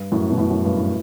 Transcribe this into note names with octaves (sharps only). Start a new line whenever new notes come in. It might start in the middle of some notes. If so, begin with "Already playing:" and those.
Already playing: G2
F#2 A2
B2
F#2 A2
F#2
G2
A2